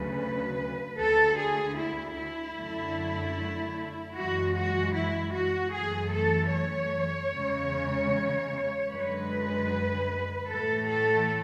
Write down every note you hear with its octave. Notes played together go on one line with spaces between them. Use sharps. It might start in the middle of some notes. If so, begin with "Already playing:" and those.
Already playing: D2 C#3 F#3 A3 B4
D2 D3 A3 A4
G#4
E4
E4
F#2 D3 A3
F#2 E3 G#3 F#4
F#4
E4
F#4
F#2 E3 A3 G#4
A4
C#5
E2 C#3 G#3
F#2 D3 G#3 B4
A2 E3 A3 A4
A4